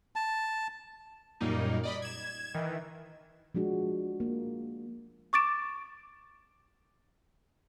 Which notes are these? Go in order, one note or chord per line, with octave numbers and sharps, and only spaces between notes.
A5
F#2 A#2 G3 A#3 D#4
D5 D#5 B5
G#6 E7
D#3 E3
F3 G#3 D4 F#4
A#3
C#6 D6 A6 D7 E7